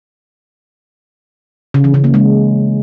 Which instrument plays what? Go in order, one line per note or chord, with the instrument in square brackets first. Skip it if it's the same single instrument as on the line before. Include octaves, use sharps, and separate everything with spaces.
[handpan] C#3
E3
C#3
A#3
G#3